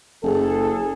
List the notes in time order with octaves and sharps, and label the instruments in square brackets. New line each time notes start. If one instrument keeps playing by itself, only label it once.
[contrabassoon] F#1 [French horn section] G#4 A4